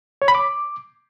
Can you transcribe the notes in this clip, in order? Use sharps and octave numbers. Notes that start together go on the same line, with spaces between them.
C#5
B5
D6